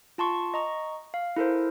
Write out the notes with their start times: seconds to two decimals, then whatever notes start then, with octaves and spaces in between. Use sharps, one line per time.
0.18 F4 A5 C6 C#6
0.54 D#5 A#5 C#6
1.14 F5
1.36 E4 A4 A#4 C5